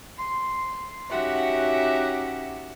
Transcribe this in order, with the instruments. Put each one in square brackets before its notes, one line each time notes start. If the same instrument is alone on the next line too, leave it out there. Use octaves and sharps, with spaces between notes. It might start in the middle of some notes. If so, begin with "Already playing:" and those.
[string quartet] C6
C#4 D#4 F#4 G4 E5 F#5